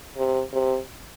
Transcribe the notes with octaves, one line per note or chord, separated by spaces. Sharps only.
C3
C3